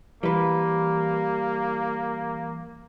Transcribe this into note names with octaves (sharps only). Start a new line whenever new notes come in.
E3 G3 A#3 B4